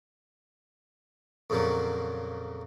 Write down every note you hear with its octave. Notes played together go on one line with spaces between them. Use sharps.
F2 A#2 C#3 F3 F#3 A#3